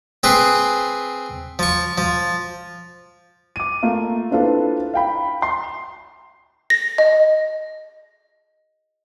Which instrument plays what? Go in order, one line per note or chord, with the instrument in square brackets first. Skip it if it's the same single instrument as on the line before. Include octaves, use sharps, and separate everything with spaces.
[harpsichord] C4 G#4 B4 C5
F3 C#6
F3
[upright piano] D6 D#7
A3 A#3 F4
C4 D4 E4 F4 A4 B4
F5 G5 B5
C6
[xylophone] A#6
D#5